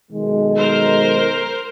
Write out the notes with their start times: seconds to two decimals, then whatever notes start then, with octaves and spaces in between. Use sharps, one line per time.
0.11 B1 D#3 G#3
0.57 A#4 C5